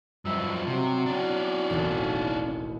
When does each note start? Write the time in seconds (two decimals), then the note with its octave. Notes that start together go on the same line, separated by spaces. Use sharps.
0.25 G2 F3 F#3 D#5 E5 E6
0.67 C3 F#3
1.06 C#4 D4
1.70 E1 A1 D#2